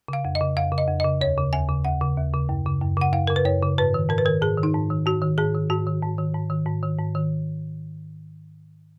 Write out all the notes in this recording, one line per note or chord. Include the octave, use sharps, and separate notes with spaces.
C#3 F5
F2
D#5
C#3
F2 F5
C#3
D#5
F2
C#3 D#5
D#2 C#5
C#3
D#2 G#5
C#3
D#2 F#5
C#3
D#2
C#3
F#2
C#3
F#2
C#3 F#5
F#2 F5
C#3 A#4
B4
F#2 C#5
C#3
G#2 B4
D#3
G#2 A#4
B4
D#3 A#4
G#2 G#4
D#3
D#4
G#2
D#3
G#2 F#4
D#3
G#2 G#4
D#3
G#2 F#4
D#3
G#2
D#3
G#2
D#3
G#2
D#3
G#2
D#3